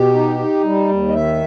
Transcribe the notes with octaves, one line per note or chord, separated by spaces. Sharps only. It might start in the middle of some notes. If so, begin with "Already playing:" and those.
Already playing: B2 G4
D#4
D#4
G3
D#2
D#5
D#3 E5